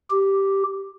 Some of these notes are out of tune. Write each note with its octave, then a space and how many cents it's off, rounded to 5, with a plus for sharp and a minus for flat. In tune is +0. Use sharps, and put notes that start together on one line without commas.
G4 -5